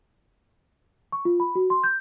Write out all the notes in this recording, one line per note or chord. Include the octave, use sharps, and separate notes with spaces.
C#6
F4
B5
F#4
C6
G6